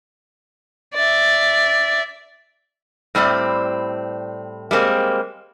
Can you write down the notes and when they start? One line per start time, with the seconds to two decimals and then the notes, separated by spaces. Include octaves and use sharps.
0.94 D5 E5
3.15 A2 G3 C4 D5
4.71 G3 G#3 A#3 C4